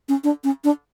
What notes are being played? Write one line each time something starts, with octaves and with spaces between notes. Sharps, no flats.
C#4
D4
C#4
D4